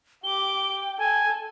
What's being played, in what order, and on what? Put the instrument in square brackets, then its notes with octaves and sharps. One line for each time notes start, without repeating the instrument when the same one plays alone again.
[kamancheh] G4 D6 [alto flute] G5 [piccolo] G7
[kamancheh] A4 [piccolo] G#5